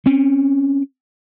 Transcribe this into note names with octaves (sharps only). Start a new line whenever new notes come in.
C4 C#4